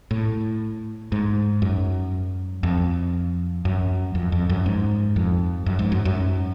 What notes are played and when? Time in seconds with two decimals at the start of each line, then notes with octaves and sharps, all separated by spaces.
0.11 A2
1.12 G#2
1.62 F#2
2.63 F2
3.65 F#2
4.15 F2
4.32 F2
4.49 F#2
4.66 G#2
5.16 F2
5.66 F#2
5.79 G#2
5.92 F#2
6.05 F#2